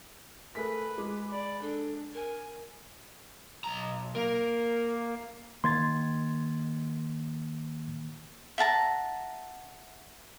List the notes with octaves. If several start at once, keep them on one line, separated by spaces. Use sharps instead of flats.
A3 G#4 A#4 B4 B6
G#3 D6
D5 B5
D4 A4
A#4 G#5
B1 A#5
A#3 A#4
D#3 A#3 C6 G#6 A6
E5 F#5 A5 A#5